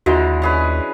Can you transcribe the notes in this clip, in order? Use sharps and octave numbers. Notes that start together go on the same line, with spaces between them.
D#2 D3 E3 G#3 F4 F#4
C#4 G#4 B4